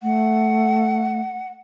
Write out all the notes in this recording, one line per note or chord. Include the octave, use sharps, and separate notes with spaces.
A3 F#5